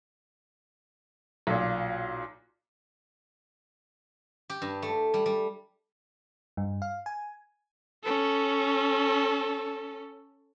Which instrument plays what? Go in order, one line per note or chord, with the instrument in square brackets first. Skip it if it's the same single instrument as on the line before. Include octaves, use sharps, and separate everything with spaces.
[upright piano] B1 A#2
[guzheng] G4
G2
A3
G3
G3
[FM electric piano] G2
F5
G#5
[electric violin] C#4 A4